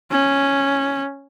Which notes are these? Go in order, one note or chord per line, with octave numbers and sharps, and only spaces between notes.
C#4